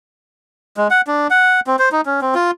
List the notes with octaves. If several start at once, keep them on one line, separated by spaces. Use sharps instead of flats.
G#3
F#5
D4
F#5
C4
C5
D#4
C#4
C4
F4